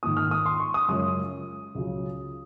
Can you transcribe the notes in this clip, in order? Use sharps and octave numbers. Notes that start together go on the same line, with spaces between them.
G#2 D#3 A#3 F4 D#6
F6
D#6
C6
C#6
D#6
F#2 C#3 G#3 C#4 F4 D#6
C#2 C#3 F#3 C#4 F4